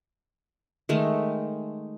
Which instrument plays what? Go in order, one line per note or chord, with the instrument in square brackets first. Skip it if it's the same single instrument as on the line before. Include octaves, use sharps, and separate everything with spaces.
[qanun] D#3 G#3 A3